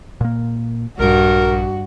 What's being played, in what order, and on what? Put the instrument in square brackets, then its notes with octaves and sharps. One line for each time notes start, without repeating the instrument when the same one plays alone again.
[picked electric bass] A#2 A#3
[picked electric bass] A#1 [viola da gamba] G2 [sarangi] F#4 [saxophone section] A#4